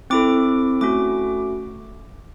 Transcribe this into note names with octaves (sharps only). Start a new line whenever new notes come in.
C4 E4 A4 D6
A3 C#4 F#4 D6